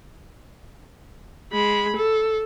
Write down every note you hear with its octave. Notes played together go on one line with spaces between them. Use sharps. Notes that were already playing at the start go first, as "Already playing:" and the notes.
G#3 B5
A4